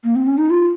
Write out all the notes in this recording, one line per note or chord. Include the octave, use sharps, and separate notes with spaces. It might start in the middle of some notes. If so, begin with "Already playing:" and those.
A#3
C4
C#4
D#4
F4